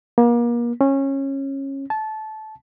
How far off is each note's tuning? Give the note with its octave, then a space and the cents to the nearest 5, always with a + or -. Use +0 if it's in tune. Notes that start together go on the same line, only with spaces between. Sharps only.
A#3 +35
C#4 -20
A5 -20